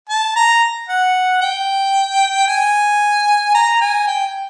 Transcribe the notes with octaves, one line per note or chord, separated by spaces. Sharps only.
A5
A#5
F#5
G5
G#5
A#5
G#5
G5